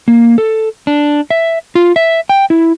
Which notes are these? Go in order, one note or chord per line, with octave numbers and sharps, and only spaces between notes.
A#3
A4
D4
E5
F4
E5
G5
E4